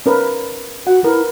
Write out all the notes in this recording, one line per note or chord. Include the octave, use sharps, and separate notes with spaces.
C#4 A#4 B4
F#4 F#5
E4 A#4 B4